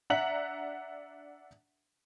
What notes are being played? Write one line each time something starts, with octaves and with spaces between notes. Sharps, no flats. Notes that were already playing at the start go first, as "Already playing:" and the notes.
D4 E5 F#5 A#5 B6 F#7